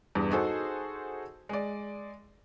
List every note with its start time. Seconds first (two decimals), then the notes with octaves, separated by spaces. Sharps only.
0.15 E2 G2
0.31 D#4 F#4 G#4 A4 C5
1.49 G#3 D5